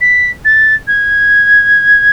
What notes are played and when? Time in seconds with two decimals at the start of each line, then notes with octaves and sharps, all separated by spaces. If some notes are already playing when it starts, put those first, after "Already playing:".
0.01 B6
0.45 A6
0.87 G#6